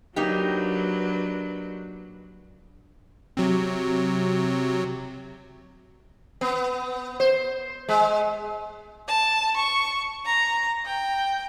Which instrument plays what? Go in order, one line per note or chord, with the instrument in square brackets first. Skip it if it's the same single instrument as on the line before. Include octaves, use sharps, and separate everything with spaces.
[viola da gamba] F#3 D4 B4 [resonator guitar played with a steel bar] A#3 D#4 G4
[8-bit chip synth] C3 F#3
[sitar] B3
C5
G#3
[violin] A5
C#6
A#5
G5